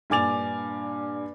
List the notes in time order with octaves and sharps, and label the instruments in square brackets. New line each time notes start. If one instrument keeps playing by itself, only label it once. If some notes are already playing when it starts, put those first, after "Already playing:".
[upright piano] G2 A#2 G#5 D6 A6 F7